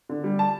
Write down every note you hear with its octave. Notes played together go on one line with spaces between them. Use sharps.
D3
G3
A5